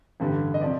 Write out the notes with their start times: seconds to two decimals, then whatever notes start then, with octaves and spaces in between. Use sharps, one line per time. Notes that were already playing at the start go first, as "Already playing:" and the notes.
0.20 A1 G2 D3 G3
0.54 D#5
0.61 C3 F3 D5